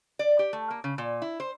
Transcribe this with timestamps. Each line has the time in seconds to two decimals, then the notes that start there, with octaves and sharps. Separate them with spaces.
0.19 D5
0.39 G4
0.53 A3
0.71 A#3
0.84 C#3
0.98 A#2
1.22 E4
1.40 C5